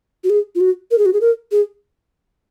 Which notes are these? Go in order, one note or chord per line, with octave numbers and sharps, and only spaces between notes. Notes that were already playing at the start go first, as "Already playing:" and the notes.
F#4
G#4
F4
F#4
A#4
G#4
F#4
G#4
A#4
G#4